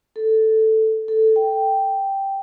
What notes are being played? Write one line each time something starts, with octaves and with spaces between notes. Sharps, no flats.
A4
A4
G5